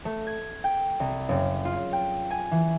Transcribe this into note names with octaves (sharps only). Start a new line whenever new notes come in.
A3
G#6
G5
C2
F#1
F4
G5
G#5
E3